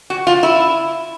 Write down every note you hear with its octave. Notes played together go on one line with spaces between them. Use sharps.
F#4
F4
E4